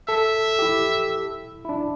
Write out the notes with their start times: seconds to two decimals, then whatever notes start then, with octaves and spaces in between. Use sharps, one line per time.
0.09 A4 E5
0.59 G4
0.62 E4
1.65 E4
1.69 D4